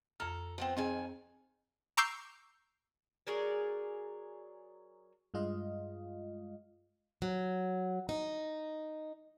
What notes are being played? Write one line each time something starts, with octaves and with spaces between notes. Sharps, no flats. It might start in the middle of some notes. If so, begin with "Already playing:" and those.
F2 A4 A#5 F6
F3 B3 C4
F2 D#3 C4 G#4 G#5
A#5 C#6 D6 E6 G6 C7
F#3 G#4 A#4 D5
G2 G#3 F4 D#5 F5
F#3
D#4